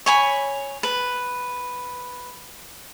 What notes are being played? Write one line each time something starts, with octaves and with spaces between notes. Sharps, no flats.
C#5 G#5 B5
B4